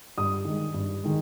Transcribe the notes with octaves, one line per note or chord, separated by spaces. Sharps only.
G2 D#6
D#3 G#3
G2
D#3 G#3